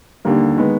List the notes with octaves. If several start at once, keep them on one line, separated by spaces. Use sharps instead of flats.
D#2 D3 G3 A#3
D#3 G#3 B3